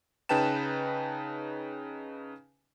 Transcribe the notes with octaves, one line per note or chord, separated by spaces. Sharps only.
C#3 D#4 B4 G5 A5 E7